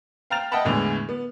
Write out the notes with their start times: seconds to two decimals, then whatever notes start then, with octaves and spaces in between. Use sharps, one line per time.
0.30 F5 G5 A#5 F6 A6 F7
0.52 D#5 E5 F#5 G5 A5 B5
0.65 E2 A2 D3 E3 G#3
1.09 B3